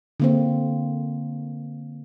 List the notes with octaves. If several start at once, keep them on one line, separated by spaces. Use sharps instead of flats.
D3 A#3 C4